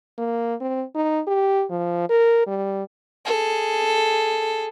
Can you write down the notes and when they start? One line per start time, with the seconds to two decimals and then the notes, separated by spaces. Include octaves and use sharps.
0.18 A#3
0.61 C4
0.95 D#4
1.27 G4
1.70 F3
2.09 A#4
2.47 G3
3.25 G#4 A4